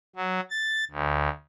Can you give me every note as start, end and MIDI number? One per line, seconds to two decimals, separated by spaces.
0.16 0.40 54
0.50 0.84 93
0.91 1.29 38